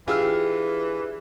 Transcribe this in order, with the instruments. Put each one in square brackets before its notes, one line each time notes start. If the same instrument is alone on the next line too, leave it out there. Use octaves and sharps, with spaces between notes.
[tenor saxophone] E3 [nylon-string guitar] D4 G4 G#4 [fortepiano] F4 E6 F6